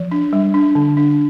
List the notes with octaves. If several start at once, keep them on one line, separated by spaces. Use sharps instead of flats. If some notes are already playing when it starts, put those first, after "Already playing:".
Already playing: F3
D4
G3
D4
D3
D4